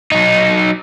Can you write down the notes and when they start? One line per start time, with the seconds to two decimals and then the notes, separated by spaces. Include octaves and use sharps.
0.12 F#3 D#4